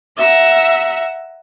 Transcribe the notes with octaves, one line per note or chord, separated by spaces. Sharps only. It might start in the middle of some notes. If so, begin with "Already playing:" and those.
E5 F#5 A#5